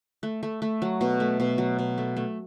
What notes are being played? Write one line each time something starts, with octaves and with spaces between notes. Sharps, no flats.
A3
A3
A3
F#3
B2
A3
B2
F#3
B2
A3
A3